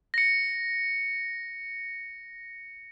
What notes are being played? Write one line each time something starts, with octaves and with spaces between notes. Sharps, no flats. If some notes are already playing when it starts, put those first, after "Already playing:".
A#6 C#7